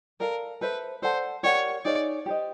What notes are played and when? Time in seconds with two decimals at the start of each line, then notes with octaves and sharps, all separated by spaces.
0.20 A4 A#4 D5 F5
0.61 A4 B4 C5 E5
1.02 A4 C5 D5 F#5 A5
1.43 G4 A#4 C#5 D5 F#5
1.85 D#4 G#4 C#5 D5 F5
2.26 G4 C5 D#5